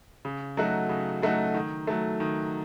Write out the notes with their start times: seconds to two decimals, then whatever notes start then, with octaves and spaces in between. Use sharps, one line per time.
0.25 C#3
0.57 F#3 A3 D#4 F#4
0.89 C#3
1.22 F#3 A3 D#4 F#4
1.54 D#3
1.87 F#3 A3
2.20 D#3